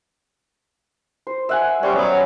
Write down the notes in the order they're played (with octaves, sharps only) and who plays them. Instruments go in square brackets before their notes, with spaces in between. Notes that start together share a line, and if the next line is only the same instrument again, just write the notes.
[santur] C5
E5 F#5 G#5
[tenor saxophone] G3 [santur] C#4 C5 C#5
[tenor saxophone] F#3 [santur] B3